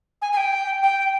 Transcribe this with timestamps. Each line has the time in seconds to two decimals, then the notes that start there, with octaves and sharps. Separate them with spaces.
0.22 G#5
0.33 G#5
0.37 G5
0.83 G5